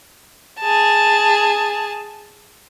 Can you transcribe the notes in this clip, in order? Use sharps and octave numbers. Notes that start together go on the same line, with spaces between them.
G#4 A5